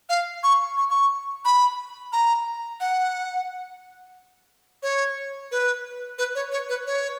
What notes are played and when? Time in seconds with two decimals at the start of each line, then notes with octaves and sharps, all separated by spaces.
0.09 F5
0.43 C#6
0.77 C#6
0.90 C#6
1.45 B5
2.12 A#5
2.80 F#5
4.83 C#5
5.51 B4
6.18 B4
6.35 C#5
6.52 C#5
6.69 B4
6.87 C#5